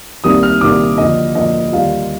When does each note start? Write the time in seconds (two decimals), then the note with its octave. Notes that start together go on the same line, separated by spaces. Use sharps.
0.24 C2 C3 D#3 G3 A#3 D#6
0.43 F6
0.61 C2 C3 D#3 G3 A#3 D6
0.98 D2 D3 F3 A#3 D#5
1.35 D2 D3 F3 A#3 D#5
1.72 D#2 D3 G3 A#3 F4 F5